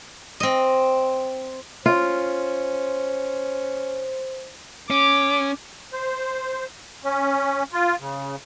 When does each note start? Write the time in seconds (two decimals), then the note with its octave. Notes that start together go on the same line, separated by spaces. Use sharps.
0.40 C4 D#5
1.86 C#4 F4 C5
4.90 C#4 D6
5.92 C5
7.04 C#4
7.73 F4
8.00 C#3